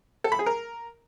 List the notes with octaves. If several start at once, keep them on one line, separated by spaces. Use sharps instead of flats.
A4
B5
G#4
A#4